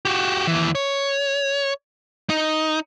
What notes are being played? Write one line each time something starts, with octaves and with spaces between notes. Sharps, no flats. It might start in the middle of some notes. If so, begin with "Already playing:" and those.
F#4 G4
D#2 E3
C#5
D#4